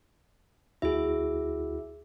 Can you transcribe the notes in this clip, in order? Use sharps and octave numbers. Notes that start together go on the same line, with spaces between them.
D2 E4 F#4 G#4 E5